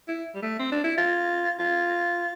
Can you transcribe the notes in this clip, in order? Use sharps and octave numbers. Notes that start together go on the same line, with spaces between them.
E4
G3
A3
C4
D4
E4
F4
F4